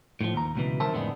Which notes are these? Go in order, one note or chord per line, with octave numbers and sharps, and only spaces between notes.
A2 D3 F3
D#2 A#5
C#2 B2 E3
C2 D#3 A#4 C5 E5 A5
F2 A2 D3 G#3 B3